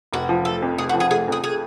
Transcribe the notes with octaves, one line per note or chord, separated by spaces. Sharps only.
F1 F#4
F3
A3 A4
F2
F1 G#4
F#4
F3
G#4
A3 G#4
F2 G#4
G#4